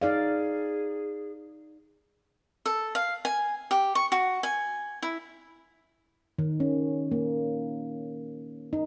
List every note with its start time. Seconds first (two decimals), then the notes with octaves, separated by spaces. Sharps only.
0.02 D#4 G#4 D5 F5
2.66 A4
2.95 F5
3.25 G#5
3.71 G4
3.95 C#6
4.12 F#4
4.43 G#5
5.02 E4
6.38 D#3
6.60 C#4
7.12 A#3
8.73 D#4